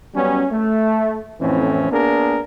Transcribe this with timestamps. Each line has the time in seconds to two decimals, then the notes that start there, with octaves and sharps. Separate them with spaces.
0.14 F#3 G3 B3 C#4
0.52 A3
1.41 F2 A2 E3 C4 C#4
1.91 A#3 B3 D4 G#4 A#4